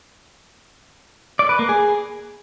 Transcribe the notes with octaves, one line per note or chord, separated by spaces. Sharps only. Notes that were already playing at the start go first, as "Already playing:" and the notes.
D5
B4
A#3
G#4